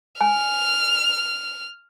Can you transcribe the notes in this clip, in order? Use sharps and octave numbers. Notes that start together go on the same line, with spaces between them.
G#5 F6